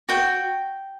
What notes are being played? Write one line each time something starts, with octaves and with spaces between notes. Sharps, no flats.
F#4 G5